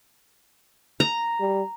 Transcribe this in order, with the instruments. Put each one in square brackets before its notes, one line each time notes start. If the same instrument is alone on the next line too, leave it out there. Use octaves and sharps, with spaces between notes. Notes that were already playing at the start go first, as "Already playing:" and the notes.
[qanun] A#5
[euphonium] G3